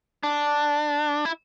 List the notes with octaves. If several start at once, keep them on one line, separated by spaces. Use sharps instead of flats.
D4
E4